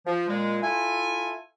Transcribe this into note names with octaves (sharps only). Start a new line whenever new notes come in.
F3
A#2 G#3
E4 F4 A4 G#5